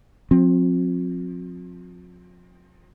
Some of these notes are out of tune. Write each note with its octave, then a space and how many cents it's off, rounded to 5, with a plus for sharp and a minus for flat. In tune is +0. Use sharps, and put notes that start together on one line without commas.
F3 +40 C4 +15